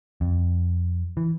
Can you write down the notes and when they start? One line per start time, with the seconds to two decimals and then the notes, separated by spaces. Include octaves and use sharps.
0.21 F2
1.17 E3